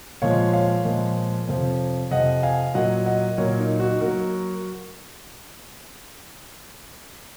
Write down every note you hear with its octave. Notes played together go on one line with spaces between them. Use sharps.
A#2 F3 G#3 C#5 F5
C#5 F5
A#2 F3 G#3
F2 C3 F3
F2 C3 F3 D#5 F#5
F5 G#5
A#2 F#3 A#3 D#5 F#5
D#5 F#5
A#2 F#3 A#3 A#4 C#5
D#4
D#4 F#4
F#3 A#3 F#4 A#4